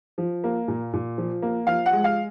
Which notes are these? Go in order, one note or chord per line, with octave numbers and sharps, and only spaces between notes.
F3
A#3
A#2
A#2
F3
A#3
F3 F5
F#5
G#3
F5